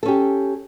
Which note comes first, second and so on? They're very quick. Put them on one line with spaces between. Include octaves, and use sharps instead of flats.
A4 C#4 G4